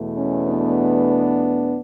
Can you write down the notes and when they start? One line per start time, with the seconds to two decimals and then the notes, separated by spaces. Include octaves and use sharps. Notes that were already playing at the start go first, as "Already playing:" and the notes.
Already playing: E2 B2 A3
0.17 C#4
0.48 B3 D4